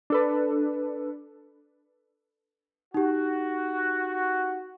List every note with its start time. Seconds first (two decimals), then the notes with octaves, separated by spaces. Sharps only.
0.10 D4 A4 B4
2.94 D#4 F#4 G4